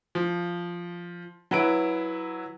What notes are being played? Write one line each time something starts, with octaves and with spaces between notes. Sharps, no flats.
F3
F#3 E4 B4 D7